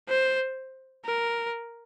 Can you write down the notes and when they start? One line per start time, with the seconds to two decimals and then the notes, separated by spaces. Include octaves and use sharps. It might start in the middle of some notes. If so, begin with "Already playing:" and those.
0.09 C5
1.05 A#4